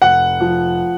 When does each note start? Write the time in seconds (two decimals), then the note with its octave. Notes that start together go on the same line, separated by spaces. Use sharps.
0.02 F1 F#5
0.40 F3